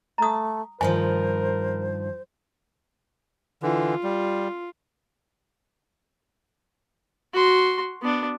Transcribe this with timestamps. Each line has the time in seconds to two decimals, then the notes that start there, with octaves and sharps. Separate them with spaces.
0.18 A3 A#5 D#6
0.81 G2 D#3 F3 A#4 C5 G#5
3.63 D3 E3 F4
4.04 G3
7.33 F#4 C6
8.02 B3 D4